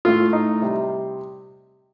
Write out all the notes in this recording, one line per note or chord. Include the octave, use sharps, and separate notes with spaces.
A2 A3 F4
D#4
C3 G3